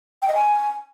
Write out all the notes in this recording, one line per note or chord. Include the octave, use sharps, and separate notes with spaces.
G5
D#5
G#5